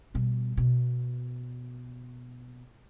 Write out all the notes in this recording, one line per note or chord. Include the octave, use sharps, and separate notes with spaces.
B2 G3
B2